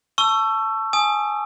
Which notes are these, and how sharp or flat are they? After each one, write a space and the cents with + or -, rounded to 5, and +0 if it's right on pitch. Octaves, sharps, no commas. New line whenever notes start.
A5 +0 C#6 +10 E6 +25
G#5 +10 D#6 +0